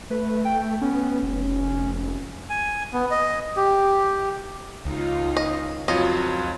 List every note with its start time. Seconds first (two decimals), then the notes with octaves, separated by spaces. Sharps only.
0.10 A3 B4
0.45 G5
0.82 B3 C#4
1.23 F1
2.50 G#5
2.93 B3
3.11 D#5
3.56 G4
4.85 C#2 D#4 F4
5.37 D#5
5.88 F2 F#3 F4 C#5 D#5